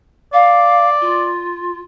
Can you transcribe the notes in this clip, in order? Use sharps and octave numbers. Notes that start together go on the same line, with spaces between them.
D5 F5
F4